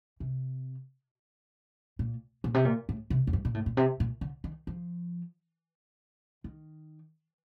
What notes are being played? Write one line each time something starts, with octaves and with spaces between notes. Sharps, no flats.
C3
A#2
A#2
C3
A#2
A2
C3
F2
G2
A#2
A2
A#2
C3
A#2
D3
D#3
F3
D#3